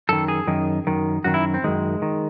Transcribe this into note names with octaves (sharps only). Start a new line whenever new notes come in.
F#2 D#3 A4
G#4
F#2 D#3
F#2 D#3
F#2 D#3 F#4
E4
C4
F#2 D#3 G#3
D#3